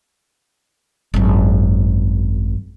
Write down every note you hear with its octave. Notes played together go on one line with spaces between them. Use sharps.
G#1 F#2